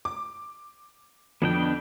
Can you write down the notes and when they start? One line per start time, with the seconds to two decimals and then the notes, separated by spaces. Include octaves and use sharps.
0.05 D6
1.42 F2 B3 D4 G5